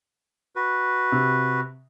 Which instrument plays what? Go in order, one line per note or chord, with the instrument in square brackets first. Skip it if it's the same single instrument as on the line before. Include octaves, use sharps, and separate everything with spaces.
[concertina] F#4 B4
[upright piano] C3